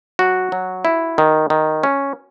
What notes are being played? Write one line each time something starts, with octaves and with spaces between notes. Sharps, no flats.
F#3 F#4
F#3
E4
D#3
D#3
C#4